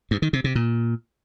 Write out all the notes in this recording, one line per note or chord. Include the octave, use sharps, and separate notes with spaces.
G2
D#3
C3
C3
A#2